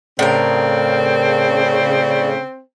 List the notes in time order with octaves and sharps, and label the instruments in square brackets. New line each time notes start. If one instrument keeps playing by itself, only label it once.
[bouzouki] A2 A#4 [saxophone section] C#3 [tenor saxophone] C4 [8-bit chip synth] D5